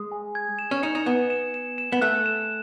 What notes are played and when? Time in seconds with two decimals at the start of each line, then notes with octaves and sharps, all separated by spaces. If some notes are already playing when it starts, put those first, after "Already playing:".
Already playing: G#3 D#6
0.12 G#5
0.35 G#6
0.59 E7
0.71 C#4
0.83 D#4 C#7
0.95 D#4
1.06 B3 E7
1.30 E7
1.54 E7
1.78 E7
1.92 B3
2.02 A3 F#6
2.26 E7